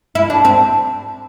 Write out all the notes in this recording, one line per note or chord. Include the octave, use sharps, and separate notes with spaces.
E4
D4
C4